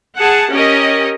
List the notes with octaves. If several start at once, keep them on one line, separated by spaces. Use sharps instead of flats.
G#4 F#5 A5
C#4 G4 A#4 D#5